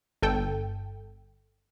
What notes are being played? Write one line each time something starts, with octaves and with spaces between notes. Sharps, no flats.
G1 A4 G5